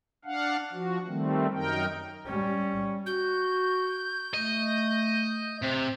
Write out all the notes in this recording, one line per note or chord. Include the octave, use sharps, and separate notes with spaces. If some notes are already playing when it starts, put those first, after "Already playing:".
D4 F5 F#5
F3 F#4
D#3 G3 A3 C4
F#2 D#4 A#4 G5
G3 C#4
F#4 G6
A3 D#5
C3 C5